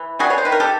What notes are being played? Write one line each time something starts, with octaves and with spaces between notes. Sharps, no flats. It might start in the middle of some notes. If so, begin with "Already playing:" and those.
Already playing: E3
G3 F#4 G#4
C#5
C5
D#3 B4
A#4
G4 A4